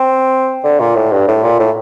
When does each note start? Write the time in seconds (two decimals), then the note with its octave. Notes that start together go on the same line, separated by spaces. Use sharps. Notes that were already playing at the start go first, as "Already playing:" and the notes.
Already playing: C4
0.64 D3
0.80 A#2
0.96 A2
1.12 G2
1.28 A2
1.44 A#2
1.59 A2